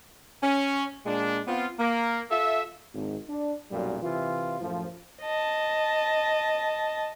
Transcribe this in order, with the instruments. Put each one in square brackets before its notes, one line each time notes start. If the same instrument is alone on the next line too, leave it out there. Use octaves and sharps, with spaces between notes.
[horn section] C#4
A#2 G#3 D4
B3 C4 F4
A#3
F4 A4 E5
[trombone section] G#1
D4
B1 F#2 A#2 F#3 G3
C3 E3 F4
F#2 A2 F3
[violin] D#5 A5